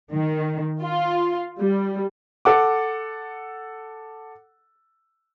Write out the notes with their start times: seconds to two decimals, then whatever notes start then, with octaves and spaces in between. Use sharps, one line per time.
0.12 D#3
0.83 F4
1.60 G3
2.45 A4 F#5 D6